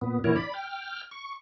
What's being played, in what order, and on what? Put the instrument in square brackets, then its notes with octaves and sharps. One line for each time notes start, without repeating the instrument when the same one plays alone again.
[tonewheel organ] A#2 B3
A#2 D3 E3 E4 A#4 C#5
D5 B5
G5 F6
C#6